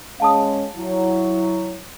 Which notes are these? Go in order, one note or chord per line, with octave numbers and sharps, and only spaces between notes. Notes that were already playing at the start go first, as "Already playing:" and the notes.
G#3 C#4 F5 A5 D#6
F#3 E4